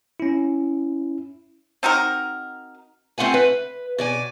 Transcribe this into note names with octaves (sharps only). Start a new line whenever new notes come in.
C#4 E4
C4 D#4 F#4 A#4
A3 C4 F4 F#5 G#5
B4
B2 D5 G#5